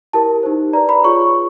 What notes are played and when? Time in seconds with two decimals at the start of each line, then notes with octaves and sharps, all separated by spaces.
0.13 E4 G4 A#4 A5
0.43 D#4 G4 C5
0.73 G4 B4 D5 A#5
0.89 B5
1.04 F4 G#4 C#5 C#6